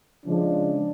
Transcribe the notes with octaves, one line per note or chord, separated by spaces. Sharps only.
C#3 F3 G#3 D4